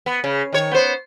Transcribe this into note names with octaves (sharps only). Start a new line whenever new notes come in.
B3
C#3
D#3 C#5
B3 C5